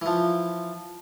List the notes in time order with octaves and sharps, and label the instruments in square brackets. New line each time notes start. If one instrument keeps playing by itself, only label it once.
[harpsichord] E3 F3